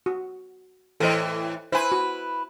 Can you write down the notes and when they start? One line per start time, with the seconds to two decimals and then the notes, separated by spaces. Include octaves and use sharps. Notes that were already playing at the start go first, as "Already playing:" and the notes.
0.06 F#4
1.00 A2 E3 A4 C5 D#5
1.72 E4 B4 C5 G#5
1.92 F#4